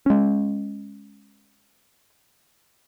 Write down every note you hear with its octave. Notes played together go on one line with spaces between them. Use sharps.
G#3 C#4